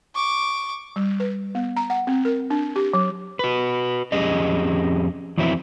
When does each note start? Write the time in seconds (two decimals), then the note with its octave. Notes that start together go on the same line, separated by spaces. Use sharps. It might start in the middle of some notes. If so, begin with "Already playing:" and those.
0.15 C#6 D6
0.96 G3
1.20 B4
1.55 B3
1.76 A#5
1.90 F#5
2.07 C4
2.25 A#4
2.50 D4
2.76 G4
2.93 F#3
3.39 F#4 B4
4.12 F2 C#4 G4 G#4 D#5
5.38 F2 E3 F#3 C4 E4